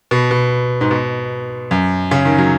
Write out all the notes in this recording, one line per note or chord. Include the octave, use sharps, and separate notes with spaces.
B2
B2
G#2
B2
F#2
C#3
D#3
F#3